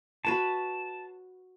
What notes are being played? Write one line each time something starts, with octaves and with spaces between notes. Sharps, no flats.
F#4 B4 C#5 A5